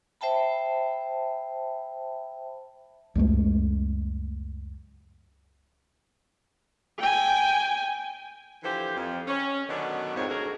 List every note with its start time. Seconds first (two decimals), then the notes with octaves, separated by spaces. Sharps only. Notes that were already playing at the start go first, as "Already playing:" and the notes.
0.21 C5 E5 G5 A5 B5
3.15 C#2 F#2 G#3 A3
6.99 G5 G#5
8.63 D3 E3 F3 G4 C5
8.96 F2
9.27 C#4
9.69 B2 D3 D#3 F#3 B3 D4
10.16 F2 G#2 C#5
10.29 D2 A3 F#4 G#4 A#4